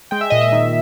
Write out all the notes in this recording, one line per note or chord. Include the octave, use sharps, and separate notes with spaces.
G#3 G5
E5
A#2 D#5
E5
D#3